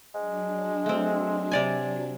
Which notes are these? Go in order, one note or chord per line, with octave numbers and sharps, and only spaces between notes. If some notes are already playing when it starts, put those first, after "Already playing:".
F#3 G#3 D4
A3 C4
C3 D5 G#5